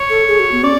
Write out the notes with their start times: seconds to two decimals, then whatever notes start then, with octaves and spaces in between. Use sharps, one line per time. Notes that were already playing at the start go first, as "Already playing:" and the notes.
Already playing: C#5
0.10 A4
0.28 G#4
0.40 F#4
0.52 B3
0.63 C#4 D5